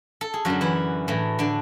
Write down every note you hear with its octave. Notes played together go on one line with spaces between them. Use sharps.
A4
G#4
F#2 D3 F#3 F#4
E3 E4
A2 E3
D3 D4